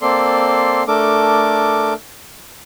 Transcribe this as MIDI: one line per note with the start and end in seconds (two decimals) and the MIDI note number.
0.02 0.83 58
0.02 0.83 60
0.02 0.83 69
0.02 0.83 74
0.02 0.83 84
0.88 1.94 57
0.88 1.94 62
0.88 1.94 69
0.88 1.94 70
0.88 1.94 86